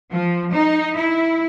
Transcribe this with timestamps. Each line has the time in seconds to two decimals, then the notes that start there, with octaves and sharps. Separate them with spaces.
0.11 F3
0.52 D#4
0.96 E4